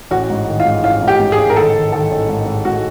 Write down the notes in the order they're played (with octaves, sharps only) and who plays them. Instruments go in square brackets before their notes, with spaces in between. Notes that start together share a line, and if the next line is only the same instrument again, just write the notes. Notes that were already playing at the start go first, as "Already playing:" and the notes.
[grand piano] A1 [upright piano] F#4
[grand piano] G#2
D#3
[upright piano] F4
[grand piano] G#2
[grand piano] A1 [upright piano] F4
[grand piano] G#2
[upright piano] G4
[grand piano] G#2
[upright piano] G#4
[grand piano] A1
[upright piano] A#4
[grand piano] D#3 [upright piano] A4
[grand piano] D#3
[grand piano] D#3 [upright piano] A4
[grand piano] A1
G#2
G#2
[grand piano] G#2 [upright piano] F#4